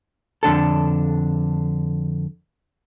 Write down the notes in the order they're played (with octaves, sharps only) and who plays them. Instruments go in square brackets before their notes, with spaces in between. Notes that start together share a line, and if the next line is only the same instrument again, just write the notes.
[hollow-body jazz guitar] F2 D3 D4 A4